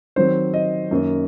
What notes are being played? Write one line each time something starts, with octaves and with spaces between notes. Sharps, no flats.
D#3 F#3 C4 C5
D#5
F#2 D#3 A#3